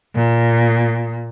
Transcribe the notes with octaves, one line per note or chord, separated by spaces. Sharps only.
A#2